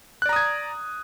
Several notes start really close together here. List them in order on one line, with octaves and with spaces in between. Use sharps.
F#6 D5 A#5 D#6 G#6